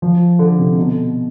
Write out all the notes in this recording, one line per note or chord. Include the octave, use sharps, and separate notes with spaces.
F3
D3
C3
B2